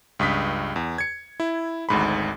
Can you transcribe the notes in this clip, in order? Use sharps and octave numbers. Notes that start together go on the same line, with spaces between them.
C#2 G2 D#6 B6
E2
G#6 C#7
E4
G#1 D2 G#2 B5